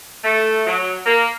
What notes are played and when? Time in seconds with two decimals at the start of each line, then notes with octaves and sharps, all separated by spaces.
0.24 A3
0.66 F#3
1.06 A#3